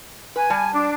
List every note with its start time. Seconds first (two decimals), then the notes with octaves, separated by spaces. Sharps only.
0.36 B4 G#5
0.50 G3 A5
0.73 D4